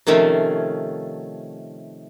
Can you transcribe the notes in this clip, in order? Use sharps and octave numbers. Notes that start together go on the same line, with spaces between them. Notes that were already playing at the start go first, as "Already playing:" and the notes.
C3 D#3 F3 A3 C#4